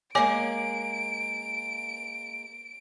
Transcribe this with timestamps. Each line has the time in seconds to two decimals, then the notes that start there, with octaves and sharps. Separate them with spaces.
0.15 G#3 A#3 C#5 G#5 D6 D7